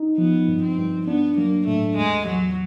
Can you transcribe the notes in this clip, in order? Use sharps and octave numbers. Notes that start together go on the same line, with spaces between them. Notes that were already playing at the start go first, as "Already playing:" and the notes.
Already playing: D#4
F3 B3
G2
C4
G2
B3 D4
F#3 A#3
A2 A3
E2 G#3
E2 F#3